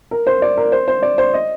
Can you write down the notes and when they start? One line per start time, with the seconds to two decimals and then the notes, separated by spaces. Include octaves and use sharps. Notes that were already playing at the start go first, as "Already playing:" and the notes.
0.11 A#4
0.27 C5
0.42 D5
0.57 A#4
0.72 C5
0.88 C5
1.02 D5
1.18 C5
1.34 D#5